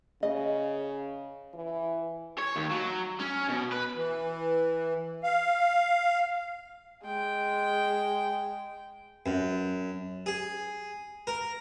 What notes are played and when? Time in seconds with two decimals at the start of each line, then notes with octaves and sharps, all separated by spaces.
0.23 C#3 D#5
1.54 E3
2.38 C#5
2.56 D#2
2.71 F#3
3.20 C#4
3.49 B2
3.72 B4
3.94 E3
5.23 F5
7.05 G#3 G5
9.26 F#2
10.26 G#4
11.27 A#4